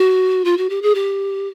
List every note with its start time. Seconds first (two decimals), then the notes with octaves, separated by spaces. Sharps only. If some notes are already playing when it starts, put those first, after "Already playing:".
Already playing: F#4
0.45 F4
0.57 F#4
0.70 G4
0.82 G#4
0.95 G4